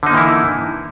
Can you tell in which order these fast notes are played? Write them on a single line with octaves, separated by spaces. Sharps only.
D3 D#4 A#3 E3 E4